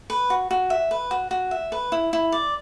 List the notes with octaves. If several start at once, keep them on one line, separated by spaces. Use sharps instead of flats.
B4
F#4
F#4
E5
B4
F#4
F#4
E5
B4
E4
E4
D5